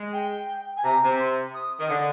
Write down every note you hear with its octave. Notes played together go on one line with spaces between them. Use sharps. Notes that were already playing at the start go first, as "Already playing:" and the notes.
Already playing: G#3
G5
G#5
C3 A#5
C3
C6
D#6
D#3 D#6
D3